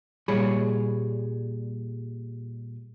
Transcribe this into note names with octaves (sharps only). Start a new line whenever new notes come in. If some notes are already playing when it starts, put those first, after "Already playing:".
A#2 G3 G#4 C#5 B5